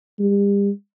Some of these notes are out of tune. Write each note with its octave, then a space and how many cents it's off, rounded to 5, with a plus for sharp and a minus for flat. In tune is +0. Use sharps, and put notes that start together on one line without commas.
G3 +40